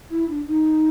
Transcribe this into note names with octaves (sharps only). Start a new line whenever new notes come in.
E4
D4
D#4